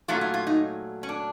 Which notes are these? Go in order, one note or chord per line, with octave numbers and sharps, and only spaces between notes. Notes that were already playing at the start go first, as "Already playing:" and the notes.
A#2 F#3 A3 C#4 F4
F4
F4
D#4
C#4
D4